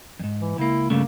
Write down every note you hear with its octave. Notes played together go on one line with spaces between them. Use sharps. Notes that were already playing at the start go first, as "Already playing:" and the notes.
F2 G#2
E3
C#2 A#3 E4
G2 C#3 A3 A#3